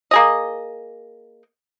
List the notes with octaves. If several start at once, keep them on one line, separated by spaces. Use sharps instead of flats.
A#3 G#4 D#5